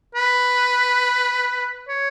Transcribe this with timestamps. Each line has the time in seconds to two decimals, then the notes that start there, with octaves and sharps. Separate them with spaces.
0.15 B4
1.88 C#5